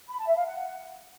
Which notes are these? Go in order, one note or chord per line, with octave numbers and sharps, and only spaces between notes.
B5
A5
E5
F5
F#5